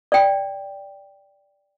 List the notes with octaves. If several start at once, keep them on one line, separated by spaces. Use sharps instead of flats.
D5 G5